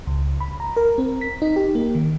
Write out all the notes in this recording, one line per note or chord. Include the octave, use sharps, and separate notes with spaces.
C#2
B5
A#5
A#4
C4
B6
D#4
G4
A#3
D#3